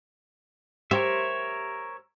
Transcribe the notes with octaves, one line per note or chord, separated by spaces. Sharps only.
G4 A#4 C5 C#5 E5